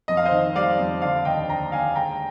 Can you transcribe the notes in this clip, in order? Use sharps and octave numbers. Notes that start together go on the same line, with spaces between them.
F2 D#5
F5
C5 D#5
D#3
G3 D5 F5
F2
D3 D5 F5
D#2 D#5 G5
D3 G5 A#5
D#2 F5 G#5
G#3 G5 A#5